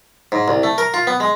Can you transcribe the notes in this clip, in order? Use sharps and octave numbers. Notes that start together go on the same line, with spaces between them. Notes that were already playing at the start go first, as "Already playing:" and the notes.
G#2
C2
A3
A#4
F4
B3
G#3